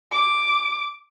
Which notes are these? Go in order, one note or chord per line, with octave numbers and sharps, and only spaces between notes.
D6